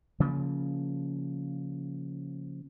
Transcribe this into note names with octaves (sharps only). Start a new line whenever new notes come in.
C#3 F3 A#3